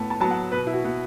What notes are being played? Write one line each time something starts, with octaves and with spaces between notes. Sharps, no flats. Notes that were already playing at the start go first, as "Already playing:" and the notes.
Already playing: A2 B3 A5
A5
F#3 B3 A5
F#5
B2 B4
E4
F#4
B3